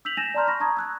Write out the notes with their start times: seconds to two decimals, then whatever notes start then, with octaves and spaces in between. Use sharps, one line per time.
0.05 E6 G6 B6 F7 F#7
0.17 G#5 G6 A6 A#6 D#7 E7
0.34 D5 A5 A#5 C6 F6 G6
0.47 B5 C#6 A#6
0.60 A5 A#5 C#6 D#6 G#6
0.77 E6 F#6 G#6